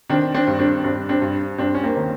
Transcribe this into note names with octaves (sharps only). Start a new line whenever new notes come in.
D#3 C4 D4
C4 D4
G2
C4 D4
G2 C4 D4
C4 D4
G2
G2 C4 D4
C#4
A#3 C4
D#3